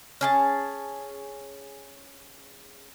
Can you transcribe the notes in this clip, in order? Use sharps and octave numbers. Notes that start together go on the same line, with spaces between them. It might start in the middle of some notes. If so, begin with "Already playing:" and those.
C#4 G#4 A5